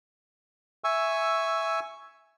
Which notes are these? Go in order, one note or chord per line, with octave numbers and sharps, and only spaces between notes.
E5 G#5 C#6 E6